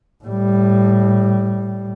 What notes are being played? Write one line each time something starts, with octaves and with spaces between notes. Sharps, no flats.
A2 G3